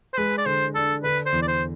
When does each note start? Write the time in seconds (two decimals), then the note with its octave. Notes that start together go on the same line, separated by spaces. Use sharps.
0.13 C5
0.17 G#3 B4
0.38 D5
0.46 D3 C5
0.75 D4 A4
1.04 D3 B4
1.26 C5
1.32 E2
1.42 D5
1.48 C5